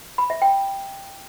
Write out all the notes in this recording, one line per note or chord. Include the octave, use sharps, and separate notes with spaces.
B5
E5
G5